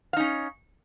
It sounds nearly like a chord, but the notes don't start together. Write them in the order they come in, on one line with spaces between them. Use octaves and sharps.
F5 D#4 C#4